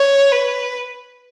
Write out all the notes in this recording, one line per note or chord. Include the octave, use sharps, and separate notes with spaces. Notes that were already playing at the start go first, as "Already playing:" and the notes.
Already playing: C#5
B4